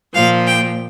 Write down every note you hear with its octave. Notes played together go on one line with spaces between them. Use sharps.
A#2 F3 F5
G5